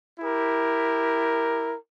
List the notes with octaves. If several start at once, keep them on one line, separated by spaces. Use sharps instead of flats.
E4 G4 A#4